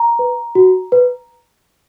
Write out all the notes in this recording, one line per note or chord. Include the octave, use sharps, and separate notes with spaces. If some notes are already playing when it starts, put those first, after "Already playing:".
Already playing: A#5
B4
F#4
B4